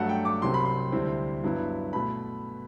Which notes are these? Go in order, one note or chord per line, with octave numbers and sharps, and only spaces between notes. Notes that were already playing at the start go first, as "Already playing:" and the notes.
Already playing: G2 F#3 A3 F#5
G5
D6
C2 C3 F#3 C4 C6
B5
C6
D2 C3 G3 C4 E4
G2 F#3 B3 E4
B2 A3 B5